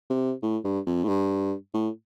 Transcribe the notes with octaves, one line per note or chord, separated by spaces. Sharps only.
C3
A2
G2
F2
A2
G2
A2